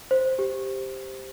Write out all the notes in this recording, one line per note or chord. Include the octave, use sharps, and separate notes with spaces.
C5
G4